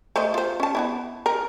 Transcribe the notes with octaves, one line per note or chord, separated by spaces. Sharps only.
A3 C5 D#5
F4 C5
C#4 A5
B3 D4 E4
A#4